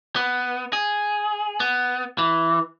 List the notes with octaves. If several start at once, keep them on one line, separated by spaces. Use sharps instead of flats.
B3
G#4
B3
E3